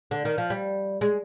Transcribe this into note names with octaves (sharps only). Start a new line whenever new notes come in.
D3
D#3
F3
G3
G#3